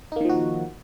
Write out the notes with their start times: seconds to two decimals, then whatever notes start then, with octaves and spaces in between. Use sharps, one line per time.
0.12 D#4
0.16 A#3
0.21 D#3
0.25 F3
0.29 F#4